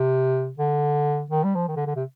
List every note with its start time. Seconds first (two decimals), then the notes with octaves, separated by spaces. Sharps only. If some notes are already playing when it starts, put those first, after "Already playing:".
Already playing: C3
0.58 D3
1.31 D#3
1.44 G3
1.55 F3
1.68 D#3
1.76 D3
1.87 D3
1.96 C3